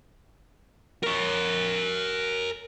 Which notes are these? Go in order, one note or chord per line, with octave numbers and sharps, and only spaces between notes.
A#4 C#5